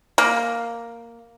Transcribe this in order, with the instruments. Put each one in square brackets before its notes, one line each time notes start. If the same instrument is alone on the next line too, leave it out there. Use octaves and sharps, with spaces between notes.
[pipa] A#3